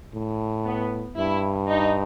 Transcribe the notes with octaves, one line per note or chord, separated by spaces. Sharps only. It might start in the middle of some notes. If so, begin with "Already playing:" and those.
A2
B3
G2 E4
D#4